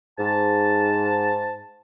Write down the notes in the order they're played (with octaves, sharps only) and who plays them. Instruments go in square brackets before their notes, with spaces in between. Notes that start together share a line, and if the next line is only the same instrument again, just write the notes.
[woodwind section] G#2 A5